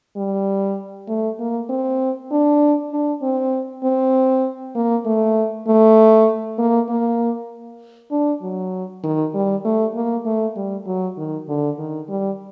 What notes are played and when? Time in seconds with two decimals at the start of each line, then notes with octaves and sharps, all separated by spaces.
0.16 G3
1.08 A3
1.39 A#3
1.69 C4
2.31 D4
2.92 D4
3.22 C4
3.84 C4
4.75 A#3
5.05 A3
5.67 A3
6.58 A#3
6.89 A#3
8.11 D4
8.42 F#3
9.03 D#3
9.34 G3
9.65 A3
9.94 A#3
10.26 A3
10.56 G3
10.86 F#3
11.17 D#3
11.48 D3
11.78 D#3
12.09 G3